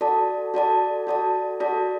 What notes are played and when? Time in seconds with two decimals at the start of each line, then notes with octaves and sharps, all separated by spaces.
0.01 F#4 A4 D5 A5
0.54 F#4 A4 D5 A5
1.07 F#4 A4 D5 A5
1.60 F#4 A4 D5 A5